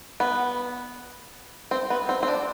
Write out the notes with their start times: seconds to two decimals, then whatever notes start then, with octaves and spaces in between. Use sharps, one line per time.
0.20 B3
1.71 C4
1.90 B3
2.09 C4
2.23 C4
2.28 D4